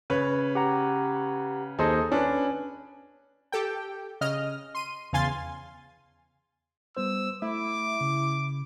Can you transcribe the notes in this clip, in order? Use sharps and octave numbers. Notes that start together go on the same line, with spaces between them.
C#3 B4 C#5
G4 F#5 A#5
D#2 D#4 G#4 A4 C5 D#5
C#4 D4 B4
G4 A4 G5
C#3 D#5 F6
C6 D#7
E2 C#3 F5 G#5 C6 A6
G3 B3 C5 E6
A3 E4 D6
C#3